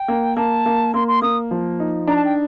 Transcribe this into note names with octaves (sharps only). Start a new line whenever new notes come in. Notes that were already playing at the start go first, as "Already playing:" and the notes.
Already playing: G5
A#3
A#3 A5
A#3
A#3 C6
C6
A#3 D#6
F3
D#4
D4 A#5
A5
G5